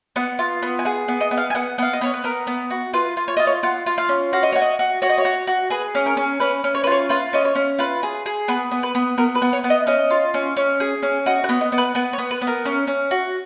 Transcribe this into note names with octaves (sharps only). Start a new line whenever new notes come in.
B3 F#5
F4
B3
G#5
G#4 F#5
B3
D#5
B3
F5
G#5
B3 F#5
B3 F5
D#5
B3 C#5
B4
B3 A#4
B3
F#4
F4 B4
F4
C#5
F4 D#5
C#5
F4 F#5
F4
F5
C#4
F#4 F5
D#5
F#4 C#5
D#5
F#4
F#4 C#5
D#5
C#5
F#4
F#4
G#4 B4
C#4
A#4
C#4
C#4 B4
C#4
C#5
B4
F4 C#5
F4 B4
C#4 D#5
C#5
C#4
F4 B4
G#4
G#4
B3 B4
B3
B4
B3
B3 A#4
B4
B3
C#5
B3
D#5
C#4 D#5
F4
C#4
C#4
G#4
C#4
F#4 D#5
F#5
B3
D#5
B3
B4
B3 B4
C#5
B3
B4
B3
A#4
C#4
C#4
F#4